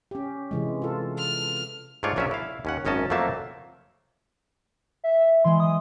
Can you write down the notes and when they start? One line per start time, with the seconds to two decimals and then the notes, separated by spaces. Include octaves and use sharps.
0.11 C#4 G4
0.51 C3 E3 G#3
0.82 F4 A4
1.18 F6
2.03 G#2 A3 D4 F4 C#5 D5
2.16 A#1 F#3 C#4 F4 D5 E5
2.31 E4 F5
2.65 D#2 C#4 F#5
2.85 G#1 F#2 C#4 D#5 A5
3.10 F2 F#3 A3 A#3 E5 A5
5.04 E5
5.45 E3 G#3 C6
5.60 D#6